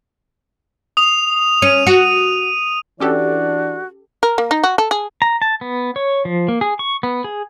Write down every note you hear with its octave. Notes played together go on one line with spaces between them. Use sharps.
D#6 F7
C#4 D#7
F#4
E3 C#4 D4 F#4 G4 A4 D5
A#4
A#3
D#4
F#4
A4
G#4
A#5
A5
B3
C#5
F3
A#3
G#4
C#6
B3
G#4